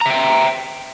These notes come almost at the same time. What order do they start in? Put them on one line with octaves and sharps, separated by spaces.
A#5 E5 G5